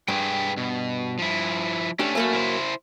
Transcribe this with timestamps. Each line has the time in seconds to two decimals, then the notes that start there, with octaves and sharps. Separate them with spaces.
0.08 G2 G#4 B4 G5
0.57 B2
1.19 F3 E4
1.99 A3 C#4 D4 G4
2.15 F#2 A3 A#3 C#4
2.32 E4 A#4 C5